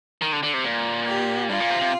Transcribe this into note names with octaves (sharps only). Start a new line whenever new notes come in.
D#3
D3
D3
C3
A#2
G4
G2 F4
A#2
C3
C3